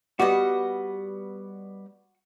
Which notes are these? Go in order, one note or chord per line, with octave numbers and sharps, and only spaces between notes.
G3 B3 F#4 D#5